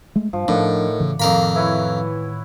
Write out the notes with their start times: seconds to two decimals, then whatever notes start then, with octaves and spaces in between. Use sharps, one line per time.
0.16 G#3 A3
0.33 G2 F3
0.48 A2 D#3 F3 D4 D5 F#5
1.00 C#3 E3
1.20 F2 A2 D#3 A#3 A#4 B5
1.56 E3 E4 B4 C#5